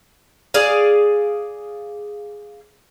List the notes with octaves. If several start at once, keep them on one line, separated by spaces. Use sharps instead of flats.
G#4 D5 F5